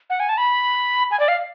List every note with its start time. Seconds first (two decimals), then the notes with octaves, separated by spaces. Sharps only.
0.10 F#5
0.20 G#5
0.29 A5
0.38 B5
1.11 G#5
1.20 D5
1.28 F5